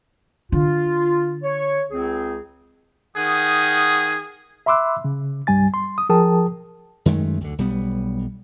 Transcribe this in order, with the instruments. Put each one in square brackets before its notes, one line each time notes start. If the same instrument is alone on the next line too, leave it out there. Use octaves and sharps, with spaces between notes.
[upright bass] D3 [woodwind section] F4
[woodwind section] C#5
C#2 C4 G#4
[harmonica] D#3 F#5 D#6 [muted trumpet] G#4
[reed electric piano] E5 B5 C6 D6 E6 F#6
C#3
C2 G2 G3 G#5 A6
C6
D#6
F3 G#4 A#4 G5 A5 D#6
[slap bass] F#2 D#3 G#3 A3
D2 D3
B1 G3 B3